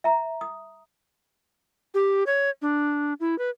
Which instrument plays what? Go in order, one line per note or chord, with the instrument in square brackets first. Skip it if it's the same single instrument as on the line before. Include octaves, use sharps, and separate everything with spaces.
[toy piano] E5 A#5
D#6
[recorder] G4
C#5
D4
E4
B4